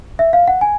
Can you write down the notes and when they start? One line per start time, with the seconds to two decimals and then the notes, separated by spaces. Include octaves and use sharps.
0.19 E5
0.33 F5
0.48 F#5
0.61 G#5